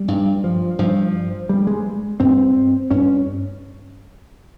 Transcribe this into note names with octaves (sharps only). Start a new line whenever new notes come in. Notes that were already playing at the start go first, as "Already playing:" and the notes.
Already playing: G3
G2
F3
G2 F3
G2 G3
G#3
G2 C4
G2 C#4